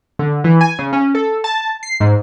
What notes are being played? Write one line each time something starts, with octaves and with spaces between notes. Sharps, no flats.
D3
E3
G#5
C#3
C#4
A4
A5
C7
G#2